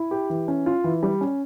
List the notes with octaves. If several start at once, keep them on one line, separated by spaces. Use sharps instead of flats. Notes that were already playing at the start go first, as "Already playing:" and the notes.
Already playing: E4
G4
E3
C#4
F4
E3
G3
C#4